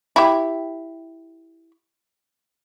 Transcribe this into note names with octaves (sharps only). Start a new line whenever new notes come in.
E4 G4